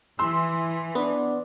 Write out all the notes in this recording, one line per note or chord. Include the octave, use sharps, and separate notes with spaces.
E3 C6 E6
B3 D4